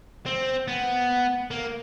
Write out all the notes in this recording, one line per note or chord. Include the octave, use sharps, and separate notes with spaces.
C4
B3
A#3